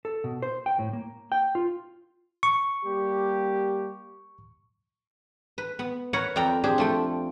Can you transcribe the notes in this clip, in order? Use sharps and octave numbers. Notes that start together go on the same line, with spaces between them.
A4
B2
C5
G5
A2
A#3
G5
F4
C#6
G3 A#3 G4
B4
B3
A#4 B4 C#5 F#5
F2 D5 G5 A#5
D4 G4 G#4 C5
F3 A3 G5